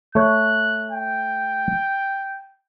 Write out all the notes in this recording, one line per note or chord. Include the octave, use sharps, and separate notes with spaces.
A3 C#5 F#6
G5